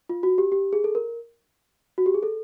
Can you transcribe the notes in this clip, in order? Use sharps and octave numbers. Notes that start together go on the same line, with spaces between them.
F4
F#4
G4
G4
G#4
A4
A#4
F#4
G4
G#4
A4